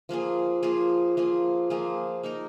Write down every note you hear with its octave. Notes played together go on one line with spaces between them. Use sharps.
F3 A#3 F4 G#4
F3 A#3 F4 G#4
F3 A#3 F4 G#4
F3 A#3 F4 G#4
A#3 D#4 A#4